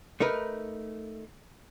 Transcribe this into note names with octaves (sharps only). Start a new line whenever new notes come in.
A3 D#4 A#4 B4